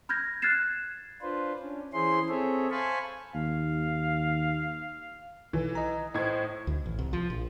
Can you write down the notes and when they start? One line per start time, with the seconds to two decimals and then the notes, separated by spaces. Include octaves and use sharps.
0.09 B5 F6 G6 G#6 A#6
0.42 F6 F#6 G#6 A6 C7 E7
1.22 D4 F4 B4 C5
1.59 C#4 D4
1.93 E3 C#4 E4 G#4 C5 C6
2.29 C4 G#4 A4 C#5 E5
2.71 C5 F5 G#5 A5 B5 C#6
3.35 D#2 F5
5.53 B1 E3
5.75 D#5 A#5
6.14 A2 C5 D#5 G#6
6.67 D2
6.86 A1
6.99 C2
7.13 F3
7.30 A#1